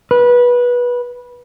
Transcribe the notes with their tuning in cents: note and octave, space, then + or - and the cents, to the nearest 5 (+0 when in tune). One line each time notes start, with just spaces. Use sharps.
B4 -20